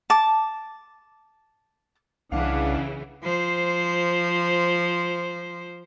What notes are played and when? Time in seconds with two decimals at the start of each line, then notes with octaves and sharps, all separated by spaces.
0.10 A5 D6
2.32 C2 C#3 E3 D4 F5 F#5
3.23 F3 C5